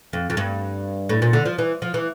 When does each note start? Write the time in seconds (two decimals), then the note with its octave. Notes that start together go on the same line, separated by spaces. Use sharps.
0.13 F2
0.30 F2
0.37 G2
1.09 A2
1.22 A#2
1.33 D3
1.46 F3
1.58 E3
1.82 F3
1.94 E3